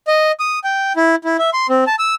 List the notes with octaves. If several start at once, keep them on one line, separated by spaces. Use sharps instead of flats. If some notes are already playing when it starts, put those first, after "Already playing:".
D#5
D#6
G5
E4
E4
E5
C6
C4
A5
E6